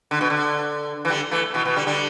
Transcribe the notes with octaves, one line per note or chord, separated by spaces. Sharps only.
D3
B2
D3
E3
D3 G3
E3 A3
B2 E3
B2 E3
D3 G3
D3 G3